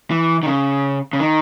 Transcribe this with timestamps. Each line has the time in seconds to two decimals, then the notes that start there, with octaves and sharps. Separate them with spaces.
0.11 E3
0.43 D#3
0.46 C#3
1.13 C#3
1.20 D#3